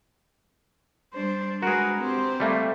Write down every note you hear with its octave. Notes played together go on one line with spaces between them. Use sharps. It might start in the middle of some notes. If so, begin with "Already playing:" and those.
G3 D4 C5 C6
G#3 F#4 G#4 A#4 B4
C4 G4 C5
G3 A3 A#3